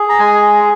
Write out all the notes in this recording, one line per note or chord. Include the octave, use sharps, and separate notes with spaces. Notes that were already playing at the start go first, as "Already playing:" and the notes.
Already playing: G#4
A#5
G#3 G#5